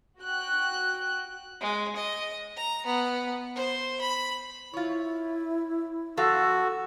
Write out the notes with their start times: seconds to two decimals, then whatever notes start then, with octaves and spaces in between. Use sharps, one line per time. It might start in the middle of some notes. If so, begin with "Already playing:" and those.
0.19 F#4 G5 F#6
1.61 G#3
1.96 D#5
2.56 A#5
2.86 B3
3.55 C5
4.01 B5
4.73 E4 F4 C#5
6.17 F2 F#4 A4 F5